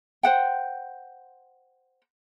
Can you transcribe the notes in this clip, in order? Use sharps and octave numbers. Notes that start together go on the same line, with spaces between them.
C5 F#5 G5